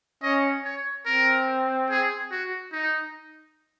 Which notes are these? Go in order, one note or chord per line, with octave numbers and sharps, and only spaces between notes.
C#4 D#5
C#5
C4 A#4
G#4
F#4
D#4